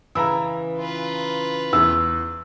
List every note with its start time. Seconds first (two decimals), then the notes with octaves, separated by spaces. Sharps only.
0.15 C#3 E3 A#5 B5 E6
0.80 F4 B4
1.73 E2 E6